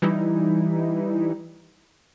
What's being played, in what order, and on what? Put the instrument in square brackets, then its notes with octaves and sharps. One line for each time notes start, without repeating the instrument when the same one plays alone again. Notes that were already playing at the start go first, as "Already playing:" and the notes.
[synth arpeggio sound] E3 G3 D#4 E4